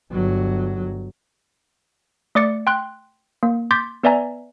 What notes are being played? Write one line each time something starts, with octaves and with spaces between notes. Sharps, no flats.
G1 F#3
A3 D5 D6 A6 C#7
G5 C6 F#6
A#3
C6 D6 G6 A6 B6
B3 B4 D5 E5 G#5 A#5